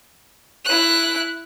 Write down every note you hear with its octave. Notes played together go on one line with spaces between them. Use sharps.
E4 F#6